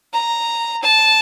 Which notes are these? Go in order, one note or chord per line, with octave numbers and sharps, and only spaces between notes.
A#5
A5